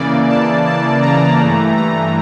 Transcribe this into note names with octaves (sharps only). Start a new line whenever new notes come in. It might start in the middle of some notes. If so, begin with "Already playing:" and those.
Already playing: C#3 E3 A#3 D5
A5
A5
A#5
G2 E3 A3
A#5